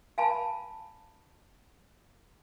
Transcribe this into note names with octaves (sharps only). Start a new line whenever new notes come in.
F5 G#5 A5 B5